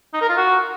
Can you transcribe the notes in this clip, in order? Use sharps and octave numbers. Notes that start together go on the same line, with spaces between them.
D#4
A#4
F4
F#4